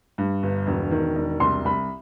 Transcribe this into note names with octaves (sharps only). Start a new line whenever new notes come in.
G2
G1
E1
D#3
E1
C2 C6
C2 B5